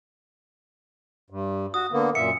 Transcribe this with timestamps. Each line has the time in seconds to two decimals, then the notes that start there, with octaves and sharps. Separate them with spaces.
1.30 G2
1.74 F#4 D#6
1.92 D3 A#3 B3
2.15 F#2 A#2 E5 C#7